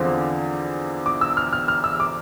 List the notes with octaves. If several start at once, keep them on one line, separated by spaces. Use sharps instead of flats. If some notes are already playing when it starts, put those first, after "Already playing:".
Already playing: E2 D3 F3 C4
D6
E6
F6
F6
F6
E6
D6